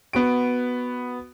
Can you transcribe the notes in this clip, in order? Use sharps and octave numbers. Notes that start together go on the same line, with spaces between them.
B3 F#4 D7